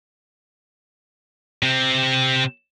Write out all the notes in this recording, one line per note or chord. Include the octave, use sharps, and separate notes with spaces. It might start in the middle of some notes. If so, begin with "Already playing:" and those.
C3 C4